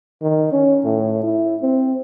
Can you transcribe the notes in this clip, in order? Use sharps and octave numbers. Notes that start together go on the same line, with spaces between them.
D#3
C#4
A2
E4
C4